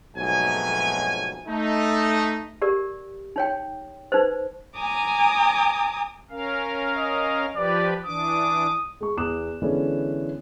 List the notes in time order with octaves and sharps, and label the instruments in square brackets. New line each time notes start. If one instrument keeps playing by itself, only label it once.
[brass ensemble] B1 F2 G#2 F#3 A3 G#5
A3 D#4
[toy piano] G4 A#4 D5
D#4 C#5 G5
D#4 B4 C5
[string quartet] G#5 A#5 D6 D#6
[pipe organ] C#4 A#4 F5
[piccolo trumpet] D#5
[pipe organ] F3 G4 B4 [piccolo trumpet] D5
[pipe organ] E3 D4 D6 [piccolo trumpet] D#6
[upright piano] G#3 C#6
E2 D6 D#6 F#6 E7
D3 E3 G#3 B3 C#4 D4